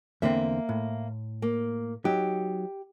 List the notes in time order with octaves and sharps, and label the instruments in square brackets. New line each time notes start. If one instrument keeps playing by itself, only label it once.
[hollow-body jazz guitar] E2 D3 C4 [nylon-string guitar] A#3 E5
[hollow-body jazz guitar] A2
[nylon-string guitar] A#3
[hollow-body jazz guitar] F#3 D#4 [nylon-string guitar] G4